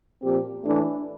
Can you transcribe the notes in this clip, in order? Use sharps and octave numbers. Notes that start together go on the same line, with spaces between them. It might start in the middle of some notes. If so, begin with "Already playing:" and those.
A#2 F3 C4 G4
A2 E3 A3 D4